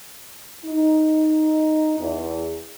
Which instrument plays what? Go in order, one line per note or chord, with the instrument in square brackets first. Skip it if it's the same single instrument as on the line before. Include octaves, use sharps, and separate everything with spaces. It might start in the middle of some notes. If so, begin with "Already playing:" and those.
[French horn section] D#4
E2